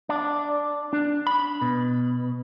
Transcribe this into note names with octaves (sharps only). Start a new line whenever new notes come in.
D4
D4
B5
B2